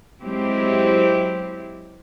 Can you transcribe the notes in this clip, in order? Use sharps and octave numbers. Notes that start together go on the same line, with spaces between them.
F#3 G#3 C4 E4 G4